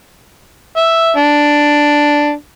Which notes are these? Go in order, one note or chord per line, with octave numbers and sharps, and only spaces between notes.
E5
D4